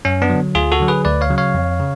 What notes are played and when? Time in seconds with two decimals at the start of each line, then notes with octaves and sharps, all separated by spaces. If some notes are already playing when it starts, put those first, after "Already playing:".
0.05 F#2 C#4
0.22 B3 D4
0.30 D3 F#3
0.55 D2 F4 G#4
0.72 F#4 A4
0.80 D3 F#3
0.88 G#4 B4
1.05 D2 B4 D5
1.21 C#5 F5
1.30 C#3 F#3
1.38 C#5 F5
1.54 F2
1.80 C#3